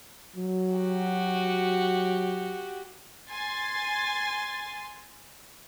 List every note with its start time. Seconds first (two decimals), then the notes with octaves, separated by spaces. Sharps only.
0.36 F#3
0.74 F#4 G4
3.30 G#5 C6 A6